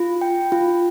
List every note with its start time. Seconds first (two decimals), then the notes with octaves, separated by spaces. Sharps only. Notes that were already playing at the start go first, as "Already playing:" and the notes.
Already playing: F4
0.21 G5
0.52 F4